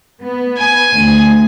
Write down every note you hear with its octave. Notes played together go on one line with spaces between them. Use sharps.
B3
G#5
D2